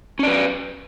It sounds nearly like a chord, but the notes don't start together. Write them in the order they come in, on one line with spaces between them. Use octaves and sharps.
C#4 D5 B4